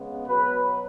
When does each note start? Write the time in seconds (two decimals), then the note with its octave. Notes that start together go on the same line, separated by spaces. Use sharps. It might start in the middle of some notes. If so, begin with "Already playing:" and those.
Already playing: C#3 G#3 B3
0.26 B2 F#3 B3 B4